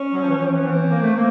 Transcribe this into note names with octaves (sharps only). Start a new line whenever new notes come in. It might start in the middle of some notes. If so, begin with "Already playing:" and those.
Already playing: C#4
F#3
F3
E3
F3
C4
E3 C#4
B3
C4
A#3
A3
A#3